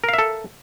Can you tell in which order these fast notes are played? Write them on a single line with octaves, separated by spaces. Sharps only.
A#4 F5 E5 A4